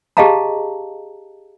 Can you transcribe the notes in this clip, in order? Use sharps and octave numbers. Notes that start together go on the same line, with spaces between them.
G4 G#4 D#5 F5 A5 A#5